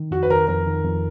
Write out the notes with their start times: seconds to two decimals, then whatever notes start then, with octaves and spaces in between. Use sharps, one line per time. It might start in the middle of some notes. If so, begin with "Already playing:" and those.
Already playing: D#3
0.11 F2 F#4
0.23 B4
0.30 D#3 A#4
0.48 F2 A#4
0.66 D#3
0.85 F2